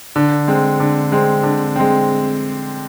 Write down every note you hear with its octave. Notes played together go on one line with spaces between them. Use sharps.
D3
G#3 C4
D3
G#3 C4
D3
G#3 C4